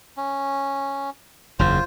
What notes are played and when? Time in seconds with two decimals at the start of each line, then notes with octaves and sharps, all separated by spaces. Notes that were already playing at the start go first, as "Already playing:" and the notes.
0.17 C#4
1.59 F#1 E2 C#3 F4 C5